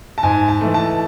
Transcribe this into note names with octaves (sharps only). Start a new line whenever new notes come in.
A5
G#2 G#5
A5
E3 A3
A5